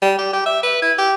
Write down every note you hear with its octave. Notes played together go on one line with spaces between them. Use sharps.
G3
G4
G4
E5
B4
E4
G4